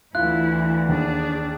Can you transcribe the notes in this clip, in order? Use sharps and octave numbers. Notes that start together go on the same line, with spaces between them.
D2 E3 E4 F4 F#6
D#2 D4 G#4